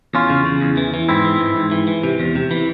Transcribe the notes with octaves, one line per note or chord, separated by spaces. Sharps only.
E2 C#4 F4
C#3
C#3
E2
E3
E3
G#2 C4 E4
E3
G#2
G#2
E3
E3
C3
E2
C3
E3